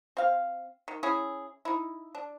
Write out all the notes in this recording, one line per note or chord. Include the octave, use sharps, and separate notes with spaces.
C4 F5
D#3
C#4 E4 G#4
D#4 E4
D4